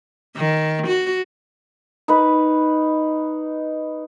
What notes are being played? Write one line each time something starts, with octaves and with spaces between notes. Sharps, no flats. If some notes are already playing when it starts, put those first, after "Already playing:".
D#3
F#4
D#4 B4 B5